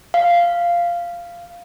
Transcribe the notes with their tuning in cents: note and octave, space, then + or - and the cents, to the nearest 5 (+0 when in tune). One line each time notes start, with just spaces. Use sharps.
F5 -10